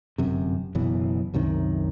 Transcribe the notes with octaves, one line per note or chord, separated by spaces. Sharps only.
G1 F#2 C3
F#1 F#2 B2 E3
C2 F#2 C3 D#3